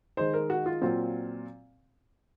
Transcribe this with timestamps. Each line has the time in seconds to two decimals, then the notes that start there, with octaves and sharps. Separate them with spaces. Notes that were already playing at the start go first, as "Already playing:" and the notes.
0.17 D#3 G#3 D#4 C5
0.34 A#4
0.50 F#4
0.66 F4
0.81 A#2 F#3 C4 F4